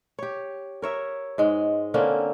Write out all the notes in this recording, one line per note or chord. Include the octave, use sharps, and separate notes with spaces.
G4 C#5
A#4 C#5 E5
G#2 G#3
D3 A#3 C4 C#4